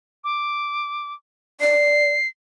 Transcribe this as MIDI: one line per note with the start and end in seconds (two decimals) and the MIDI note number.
0.24 1.13 86
1.61 2.12 74
1.61 2.28 96